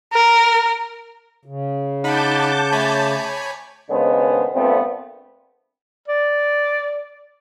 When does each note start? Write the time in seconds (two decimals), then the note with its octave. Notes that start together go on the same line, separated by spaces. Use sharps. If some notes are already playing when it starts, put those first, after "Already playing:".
0.13 A#4
1.45 C#3
2.04 D#4 F#5 A5 B5 D6 G6
2.73 A3 C#5 G#5 B5
3.89 D#2 C#3 G#3 B3 D4 C5
4.53 G2 A#2 A3 B3 C4
6.08 D5